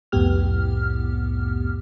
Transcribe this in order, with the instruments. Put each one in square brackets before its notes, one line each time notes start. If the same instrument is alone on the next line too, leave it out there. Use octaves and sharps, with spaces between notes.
[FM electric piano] C2 F2 A2 B3 G4 F6